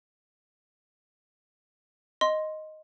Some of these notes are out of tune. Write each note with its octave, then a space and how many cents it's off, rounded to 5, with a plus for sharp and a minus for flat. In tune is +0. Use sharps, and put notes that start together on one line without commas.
D#5 +0 C6 +0